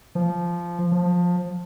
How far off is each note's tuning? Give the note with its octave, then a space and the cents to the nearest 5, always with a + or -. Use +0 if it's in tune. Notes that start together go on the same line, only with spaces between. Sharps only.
F3 -10
F3 +20